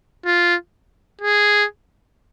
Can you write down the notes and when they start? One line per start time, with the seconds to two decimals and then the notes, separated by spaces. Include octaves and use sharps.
0.26 F4
1.21 G#4